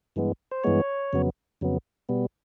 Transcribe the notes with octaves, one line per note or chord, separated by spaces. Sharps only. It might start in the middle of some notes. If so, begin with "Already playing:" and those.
G2 E3 G#3 B3
C5
G2 E3 G#3 B3 C#5
F2 C#3 F#3 B3
F2 C#3 F#3 B3
B2 G3 B3